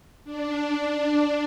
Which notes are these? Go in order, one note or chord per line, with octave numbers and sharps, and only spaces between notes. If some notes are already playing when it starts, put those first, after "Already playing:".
D4